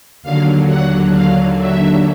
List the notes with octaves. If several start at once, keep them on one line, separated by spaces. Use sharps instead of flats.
D#2 D3 F#3 F5
F#5
F5
E5